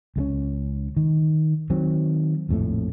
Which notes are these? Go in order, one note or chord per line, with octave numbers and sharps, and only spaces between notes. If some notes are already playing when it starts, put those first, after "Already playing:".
C#2 G#3 C#4
D#3
D#3 F#3 C4
A#1 F2 A2 A3